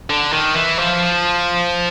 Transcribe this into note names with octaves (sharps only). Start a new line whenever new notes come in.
D3
D#3
E3
F3